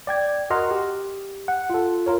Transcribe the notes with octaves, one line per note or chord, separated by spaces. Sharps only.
D5 G5 G#6
F#4 A#4 D#5 F#5 C6 F6
G4
F#5
F4 A4
F4 A#4 C#5